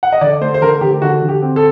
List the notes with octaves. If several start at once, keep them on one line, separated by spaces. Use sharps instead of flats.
F#5
D#5
D3 D5
A3 C5
C5
D3 A#4
D3 G4
D3 F#4
D3
G4
C4
A4